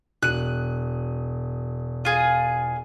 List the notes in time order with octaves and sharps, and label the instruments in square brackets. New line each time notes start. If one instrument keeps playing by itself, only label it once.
[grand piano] E1 D#7 [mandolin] F#6
[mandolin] F4 G#4